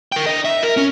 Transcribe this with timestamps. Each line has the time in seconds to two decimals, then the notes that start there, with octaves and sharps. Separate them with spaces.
0.12 A#4 G5
0.27 D4 D#5
0.45 E5
0.63 A#4
0.77 C#4